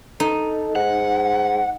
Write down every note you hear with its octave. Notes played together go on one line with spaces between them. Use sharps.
D#4 A4
G#2 F#5